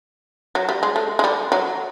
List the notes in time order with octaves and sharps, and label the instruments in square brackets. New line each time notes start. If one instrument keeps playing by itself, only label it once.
[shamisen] F#3
G3
G#3
A3
G#3
G3
F#3